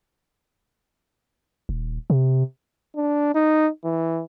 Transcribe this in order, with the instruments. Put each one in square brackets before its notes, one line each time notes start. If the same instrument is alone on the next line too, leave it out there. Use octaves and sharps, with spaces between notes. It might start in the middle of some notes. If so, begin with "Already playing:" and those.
[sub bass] D#1
C3
[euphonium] D4
D#4
E3